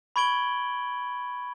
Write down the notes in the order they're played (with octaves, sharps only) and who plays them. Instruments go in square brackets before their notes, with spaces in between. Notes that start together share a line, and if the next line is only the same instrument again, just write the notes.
[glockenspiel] B5 C#6 G#6 D7 F#7 G7